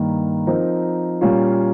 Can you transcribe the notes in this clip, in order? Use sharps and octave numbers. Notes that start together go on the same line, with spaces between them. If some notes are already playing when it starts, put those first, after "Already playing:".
Already playing: G2 D#3 A#3
F3 C4 D#4 A#4
A#2 G3 A#3 C#4 F4